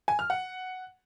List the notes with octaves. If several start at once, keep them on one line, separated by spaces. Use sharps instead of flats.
G#5
F6
F#5